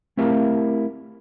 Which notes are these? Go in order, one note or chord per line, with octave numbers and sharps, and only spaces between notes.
A3 C4 E4 G4 A#4 F5